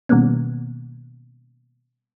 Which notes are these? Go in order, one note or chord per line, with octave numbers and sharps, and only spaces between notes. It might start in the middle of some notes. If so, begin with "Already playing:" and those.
B2 D#3 G3 A#3 B3 C#4